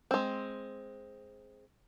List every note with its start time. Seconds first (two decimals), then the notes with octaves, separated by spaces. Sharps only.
0.11 G#3 C4